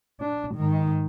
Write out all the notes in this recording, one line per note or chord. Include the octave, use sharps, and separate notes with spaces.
D4
G#2 D#3